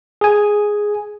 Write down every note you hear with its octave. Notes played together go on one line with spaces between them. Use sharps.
G#4 G#5